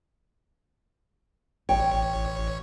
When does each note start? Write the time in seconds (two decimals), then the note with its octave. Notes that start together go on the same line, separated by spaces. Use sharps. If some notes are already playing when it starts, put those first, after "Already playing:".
1.69 A1 C#5 G5